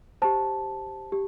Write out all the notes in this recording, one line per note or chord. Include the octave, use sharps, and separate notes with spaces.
G4 C5 A5
G4